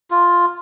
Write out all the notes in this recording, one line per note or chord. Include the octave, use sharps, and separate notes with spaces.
F4